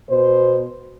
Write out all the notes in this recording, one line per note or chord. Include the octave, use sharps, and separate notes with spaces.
B2 C5